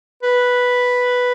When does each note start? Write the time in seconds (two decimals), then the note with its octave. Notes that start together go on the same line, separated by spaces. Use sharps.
0.23 B4